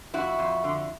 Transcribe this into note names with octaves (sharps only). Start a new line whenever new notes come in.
F2 E4 F#4
F2
D3